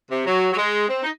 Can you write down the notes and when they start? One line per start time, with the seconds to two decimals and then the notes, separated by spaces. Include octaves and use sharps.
0.10 C3
0.26 F#3
0.52 F#3
0.57 G#3
0.88 C4
1.03 D#4